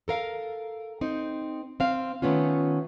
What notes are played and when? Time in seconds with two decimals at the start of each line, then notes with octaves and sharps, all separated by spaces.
0.08 A4 A#4 F5
1.01 C4 D#4
1.80 C4 F5
2.22 D#3 E3 A3 B3 C#4 F4